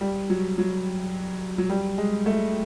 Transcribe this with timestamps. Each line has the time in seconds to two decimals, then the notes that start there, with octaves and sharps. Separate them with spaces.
0.01 G3
0.30 F#3
0.58 F#3
1.58 F#3
1.70 G3
1.98 G#3
2.26 A3